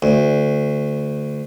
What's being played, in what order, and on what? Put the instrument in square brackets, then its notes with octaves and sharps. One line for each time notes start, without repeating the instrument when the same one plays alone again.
[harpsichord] D2